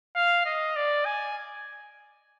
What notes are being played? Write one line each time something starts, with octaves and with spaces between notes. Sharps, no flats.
F5
D#5
D5
G#5